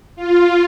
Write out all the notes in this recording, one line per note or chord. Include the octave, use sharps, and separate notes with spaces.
F4